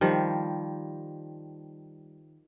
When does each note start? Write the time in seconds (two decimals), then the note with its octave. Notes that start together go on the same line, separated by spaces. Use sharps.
0.01 D#3 F3 G3